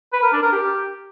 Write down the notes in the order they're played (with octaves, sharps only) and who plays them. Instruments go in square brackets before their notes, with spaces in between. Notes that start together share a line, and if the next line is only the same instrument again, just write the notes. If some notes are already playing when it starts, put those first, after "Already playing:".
[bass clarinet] B4
A#4
D4
A#4
G4